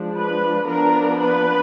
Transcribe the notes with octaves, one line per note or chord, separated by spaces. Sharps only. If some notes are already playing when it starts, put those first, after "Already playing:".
Already playing: F3 G#3 D4
B4
F3 B3 D4 A#4
B4